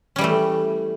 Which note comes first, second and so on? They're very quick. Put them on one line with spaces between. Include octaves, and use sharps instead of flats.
C#4 G3 E3 A3